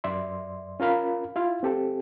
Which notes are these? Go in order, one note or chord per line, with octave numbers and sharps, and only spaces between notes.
F#2 D5 E5 C6
C#4 F4 A#4 F5 B5
E4 F4 F5
C4 G4 A4